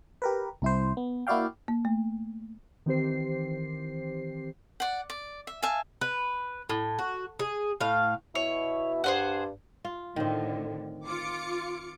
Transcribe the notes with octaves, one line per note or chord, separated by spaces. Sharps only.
G4 A#4 B4
C2 E4 C5
B3
A#3 E4 F#4 D5 F5 G5
A#3
A3
D#3 E3 C4 G4 C5 C7
D5 F#5
D5
E5
E5 F5 G#5 A5
B4
A2
F#4
G#4
A2 F5
B2 E4 C#5
G2 G#4 C5 F#5
F4
A2 D3 D#3 C4
F4 D6 C#7